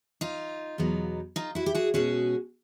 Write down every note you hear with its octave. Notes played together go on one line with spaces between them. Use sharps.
D#4 F4
E2 B2 F#3 B3 D#4
D#4 F4
E4 F#4
G4
F#4 G#4
B2 G#3 C#4 F#4 G#4